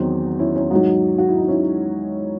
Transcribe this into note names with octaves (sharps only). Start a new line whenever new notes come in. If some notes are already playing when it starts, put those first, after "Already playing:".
Already playing: E2 D#3 F#3 C4 D#4
C#4 E4
C#4 E4
G#2 F#3 D#4 F#4
F#4
E4
D#4
C#4 E4